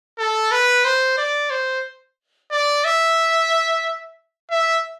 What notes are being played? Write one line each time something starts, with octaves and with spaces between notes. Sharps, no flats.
A4
B4
C5
D5
C5
D5
E5
E5